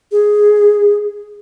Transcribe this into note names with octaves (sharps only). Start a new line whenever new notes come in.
G#4